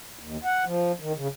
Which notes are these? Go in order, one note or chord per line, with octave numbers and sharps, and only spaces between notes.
D#2
F#5
F3
D#3
C#3